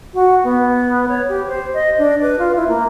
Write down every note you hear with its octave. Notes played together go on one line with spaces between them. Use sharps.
F#4
B3
C#5
G4
C5
D#5
D4
B4
F4
E4
A#3